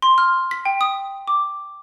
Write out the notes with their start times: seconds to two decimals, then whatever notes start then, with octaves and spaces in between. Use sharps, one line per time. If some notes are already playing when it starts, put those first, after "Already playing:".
0.02 C6
0.18 F6
0.51 B6
0.65 G5
0.81 D#6
1.28 D6